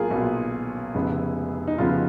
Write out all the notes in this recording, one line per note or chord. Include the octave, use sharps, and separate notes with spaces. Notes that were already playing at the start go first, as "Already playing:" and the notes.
Already playing: B1 A#2 F#3 B3 F4 G#4 A#4
B1 A#2 F#3 B3
F1 F2 C#3 G#3 B3
D#4
F1 F2 C#3 G#3 B3 F4